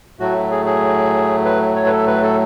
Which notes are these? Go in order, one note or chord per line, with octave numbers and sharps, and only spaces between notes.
A2 F#3 A3 F#4
G#4
G#4
B4
C#5
B4
A4
B4
A4